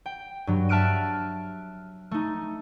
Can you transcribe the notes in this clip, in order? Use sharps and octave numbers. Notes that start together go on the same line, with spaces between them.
G5
G2 F#3
E5 A5 F6 F#6 D7 D#7
A3 D#4